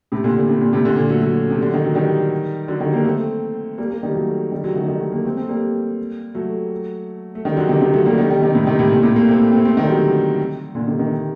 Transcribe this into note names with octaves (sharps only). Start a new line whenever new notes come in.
A2 C3
A#2 D3
A#2
C3
A#2
A2 C3
A#2 D3
A#2
F#3 A3
F#3 A3
C3
D3
D#3
F#3
D#3 G3
D3 F#3
D#3 G3
G3 A#3
A3 C4
G3 A#3
G3 A#3
D#3 G3
F#3 A3
D#3 G3
D3 F#3
A3
D#3 G3
D#3 G3
F#3 A3
G3 A#3
A3 C4
A3 C4
G3 A#3
F#3 A3
A3
D#3 G3
D3 F#3
C3 D#3
C3 D#3
F#3 A3
G3 A#3
D#3 G3
D#3 G3
C3 D#3
A2 C3
C3 D#3
A2 C3
A#2
A2 C3
G3 A#3
A3 C4
A3 C4
A3 C4
C3 D#3
G3
D3 F#3
A#2 D3
C3 D#3
C3 D#3